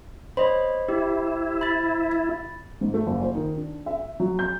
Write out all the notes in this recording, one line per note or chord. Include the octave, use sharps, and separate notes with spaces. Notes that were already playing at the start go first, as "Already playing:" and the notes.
C5 C#5 D#5 B5
E4 G4
B5 A6
G#2
A3
F#1
C5
D#3
D4
E5
F#3
G6